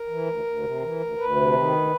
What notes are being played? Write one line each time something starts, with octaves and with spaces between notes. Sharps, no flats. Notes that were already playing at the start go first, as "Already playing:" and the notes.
Already playing: A#4
E3
D2
D2
C3
E3
D2
D2 B4
C3
D#3
D2